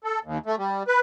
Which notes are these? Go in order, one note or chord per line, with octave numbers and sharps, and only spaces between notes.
A4
D#2
A3
G3
B4